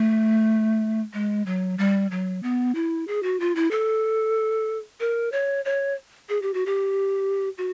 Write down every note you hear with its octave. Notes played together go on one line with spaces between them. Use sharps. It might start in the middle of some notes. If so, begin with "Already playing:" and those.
Already playing: A3
G#3
F#3
G3
F#3
B3
E4
G#4
F#4
F4
E4
A4
A#4
C#5
C#5
G#4
G4
F#4
G4
F#4